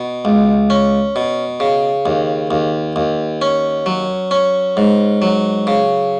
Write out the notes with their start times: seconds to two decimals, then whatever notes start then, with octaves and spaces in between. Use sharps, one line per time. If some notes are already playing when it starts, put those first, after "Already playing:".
Already playing: B2
0.25 C#2
0.70 C#4
1.16 B2
1.60 C#3
2.06 D#2
2.51 D#2
2.96 D#2
3.42 C#4
3.86 F#3
4.31 C#4
4.77 G#2
5.22 F#3
5.67 C#3